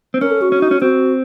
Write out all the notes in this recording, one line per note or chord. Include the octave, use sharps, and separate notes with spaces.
C4
C#4 A#4
A4
F#4
C#4
D#4
C#4
C4 F#4